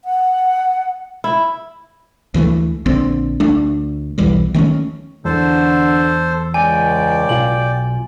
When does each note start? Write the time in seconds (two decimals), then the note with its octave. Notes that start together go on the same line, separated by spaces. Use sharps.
0.05 F#5
1.24 E4
2.34 D2 E3 F3 A3
2.86 A#1 D3 C4
3.40 D2 A3 D4
4.18 B1 E2 E3 G3
4.54 D#3 A3 C4 C#4
5.25 E2 D3 A4 C5
6.54 C#2 D5 G5 G#5
7.29 B1 F4 F#7